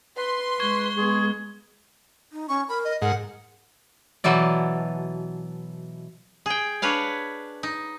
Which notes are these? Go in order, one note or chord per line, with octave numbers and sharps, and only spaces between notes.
B4 C6
G#3 C#6 G#6 G7
G#3 B3 G#4
D#4
C#4 C#6
A#4 B5
D#5
G#2 A#4 F#5
B2 E3 F#3 E4 D5
G#4 G5
D4 B4 C#5 F5
D#4